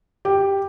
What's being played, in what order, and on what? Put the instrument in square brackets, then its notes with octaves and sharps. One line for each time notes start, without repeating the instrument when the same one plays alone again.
[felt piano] G4